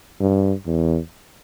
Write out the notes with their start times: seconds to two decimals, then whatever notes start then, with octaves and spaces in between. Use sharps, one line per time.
0.20 G2
0.66 E2